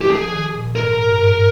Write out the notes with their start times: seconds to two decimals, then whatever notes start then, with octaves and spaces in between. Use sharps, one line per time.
0.01 G4
0.11 F3 G#4
0.32 D#3
0.54 A#2
0.75 G#2 A#4
0.92 G#2
1.07 G2
1.22 G#2